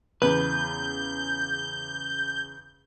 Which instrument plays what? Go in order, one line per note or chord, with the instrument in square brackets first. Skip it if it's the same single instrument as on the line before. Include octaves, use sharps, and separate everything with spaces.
[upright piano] E2 C#3 [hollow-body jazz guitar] B4 [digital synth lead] G6